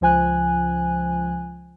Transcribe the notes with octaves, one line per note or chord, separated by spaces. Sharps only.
C#2 F3 G#5 F#6